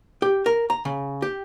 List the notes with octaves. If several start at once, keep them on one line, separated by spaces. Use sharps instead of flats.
G4
A#4
A#5
C#3
G4